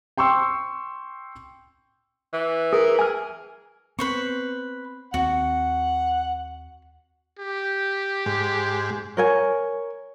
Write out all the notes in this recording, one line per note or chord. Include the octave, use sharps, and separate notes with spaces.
G5 C6 C#6 E6
E3
G#4 A#4
G#4 G#5 F6
B3 C4 B4 C5 C#6
D#2 C4 F#4 F#5
G4
G#2
A#4 C#5 G#5